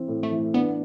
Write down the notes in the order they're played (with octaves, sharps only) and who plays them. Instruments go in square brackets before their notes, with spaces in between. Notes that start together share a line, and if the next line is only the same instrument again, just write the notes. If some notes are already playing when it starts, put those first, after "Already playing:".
Already playing: [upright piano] E3 C4
A2
[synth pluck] A3
[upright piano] E3
[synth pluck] B3 [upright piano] D4